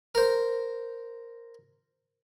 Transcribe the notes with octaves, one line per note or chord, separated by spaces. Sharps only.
A#4 C5